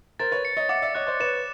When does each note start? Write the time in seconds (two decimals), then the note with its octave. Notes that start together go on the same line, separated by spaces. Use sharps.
0.19 A#4 C5 A6
0.32 B4 C#5
0.45 C#7
0.57 C#5 D#5
0.69 E5 F#5 D6
0.82 D5 E5
0.95 C#5 D#5 F#6
1.07 C5 D5
1.20 B4 C#5 E7